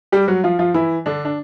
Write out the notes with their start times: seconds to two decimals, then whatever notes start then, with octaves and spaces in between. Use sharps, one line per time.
0.12 G3 G4
0.28 F#3 F#4
0.44 F3 F4
0.59 F3 F4
0.74 E3 E4
1.06 D3 D4
1.25 D4